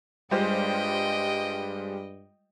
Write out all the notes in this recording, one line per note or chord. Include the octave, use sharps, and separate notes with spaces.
G2 G3 G#3 F4 G4 C5 D#5 G5